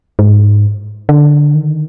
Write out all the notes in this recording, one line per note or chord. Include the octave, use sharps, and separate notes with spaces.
G#2
D3
D#3